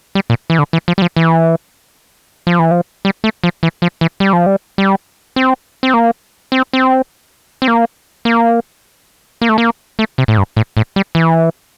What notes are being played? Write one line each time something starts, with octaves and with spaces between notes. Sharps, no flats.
G3
A#2
E3
D3
E3
F3
G3
F3
E3
F3
E3
F3
G3
A3
F3
E3
F3
E3
G3
F3
G3
G3
C4
C4
A#3
C4
C4
C4
A#3
A#3
A#3
A3
A#3
A3
C3
A2
G2
A2
A2
G3
E3